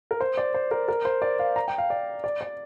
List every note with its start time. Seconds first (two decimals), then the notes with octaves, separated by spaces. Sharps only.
0.11 A#4
0.21 C5
0.37 D5
0.54 C5
0.71 A#4
0.88 A#4
1.05 C5
1.22 D5
1.39 F5
1.56 A#5
1.68 G5
1.78 F5
1.90 D5
2.24 D5
2.41 D5